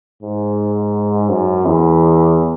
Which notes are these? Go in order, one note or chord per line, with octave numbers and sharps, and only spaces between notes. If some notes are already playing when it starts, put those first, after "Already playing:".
G#2
F#2
E2